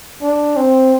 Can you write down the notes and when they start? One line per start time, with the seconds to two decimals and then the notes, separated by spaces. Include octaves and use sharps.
0.22 D4
0.57 C4